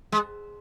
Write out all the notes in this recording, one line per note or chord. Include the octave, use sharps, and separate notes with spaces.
G#3